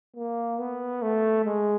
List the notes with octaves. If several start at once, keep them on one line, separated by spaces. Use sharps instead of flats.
A#3
B3
A3
G#3